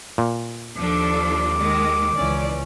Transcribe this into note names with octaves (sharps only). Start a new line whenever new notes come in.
A#2
D#2 F3 D4 A4 D6
D#3 G#3
C#2 E3 C#4 D5